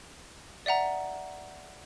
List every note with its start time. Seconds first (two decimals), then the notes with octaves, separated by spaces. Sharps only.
0.66 D5 E5 F#5 A#5